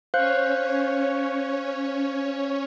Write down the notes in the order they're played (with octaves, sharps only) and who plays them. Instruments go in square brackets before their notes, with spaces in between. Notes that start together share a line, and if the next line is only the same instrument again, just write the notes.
[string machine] C#4 C#5 [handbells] C5 F5 F#6